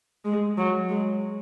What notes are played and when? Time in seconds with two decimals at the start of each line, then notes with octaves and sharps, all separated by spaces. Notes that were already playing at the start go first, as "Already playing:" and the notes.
0.24 G#3
0.57 F#3
0.89 G#3